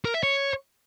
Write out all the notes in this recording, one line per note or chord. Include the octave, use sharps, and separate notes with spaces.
A#4
E5
C#5